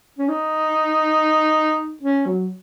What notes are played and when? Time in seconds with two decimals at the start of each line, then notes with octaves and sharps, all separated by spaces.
0.18 C#4
0.29 D#4
2.03 C#4
2.26 F#3